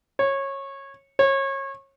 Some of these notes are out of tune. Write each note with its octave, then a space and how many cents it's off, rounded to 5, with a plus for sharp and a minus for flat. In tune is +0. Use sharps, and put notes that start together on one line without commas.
C#5 -20
C#5 -30